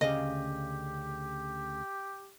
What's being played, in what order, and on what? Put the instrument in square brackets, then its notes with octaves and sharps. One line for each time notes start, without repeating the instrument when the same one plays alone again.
[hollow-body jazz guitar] D2 C#3 F5 [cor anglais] G4 [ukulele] D#5